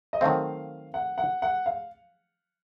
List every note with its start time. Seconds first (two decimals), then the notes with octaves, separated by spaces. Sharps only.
0.13 D#5
0.21 D#3 F#3 A3 C4 F5
0.94 F#5
1.18 F#5
1.42 F#5
1.66 F5